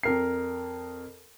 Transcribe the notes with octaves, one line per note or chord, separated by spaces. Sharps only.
F2 A#4 C7